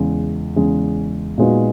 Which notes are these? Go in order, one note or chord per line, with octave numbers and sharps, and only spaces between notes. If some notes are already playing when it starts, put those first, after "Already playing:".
Already playing: E2 C#3 G#3
E2 C#3 G#3
A#2 G#3 B3 D#4 F#4